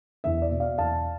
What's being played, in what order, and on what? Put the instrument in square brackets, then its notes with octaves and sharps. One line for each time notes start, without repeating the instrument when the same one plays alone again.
[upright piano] E2 E5
D5
B2
D5 F5
E2 F5 A5